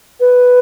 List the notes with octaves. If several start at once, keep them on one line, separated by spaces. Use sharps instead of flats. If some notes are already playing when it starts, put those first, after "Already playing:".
B4